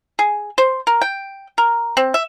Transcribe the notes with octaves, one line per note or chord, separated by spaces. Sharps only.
G#4
C5
A#4
G5
A#4
C4
E5